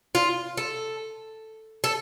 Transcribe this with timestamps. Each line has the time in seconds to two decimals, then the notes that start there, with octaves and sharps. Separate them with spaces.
0.15 F4
0.57 A4
1.84 A4